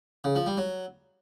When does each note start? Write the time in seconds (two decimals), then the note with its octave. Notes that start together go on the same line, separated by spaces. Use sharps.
0.24 C#3
0.35 F3
0.46 G3
0.57 F#3